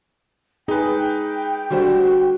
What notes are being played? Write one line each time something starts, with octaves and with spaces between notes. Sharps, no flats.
D#4 G#4 B4 G5
D3 G3 F#4 C5